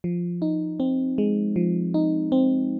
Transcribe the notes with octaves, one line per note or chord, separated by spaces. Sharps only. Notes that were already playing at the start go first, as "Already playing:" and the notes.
F3
D#4
C4
G#3
F3
D#4
C4